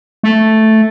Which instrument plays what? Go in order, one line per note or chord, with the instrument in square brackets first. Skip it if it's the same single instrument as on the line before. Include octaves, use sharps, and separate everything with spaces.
[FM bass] A3